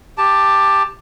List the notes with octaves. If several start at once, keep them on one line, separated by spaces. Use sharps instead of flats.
G4 A5